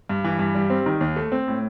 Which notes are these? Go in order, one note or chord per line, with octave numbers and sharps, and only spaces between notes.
G2
E3
G2
G3
C4
D#3
D#2
A3
C4
A2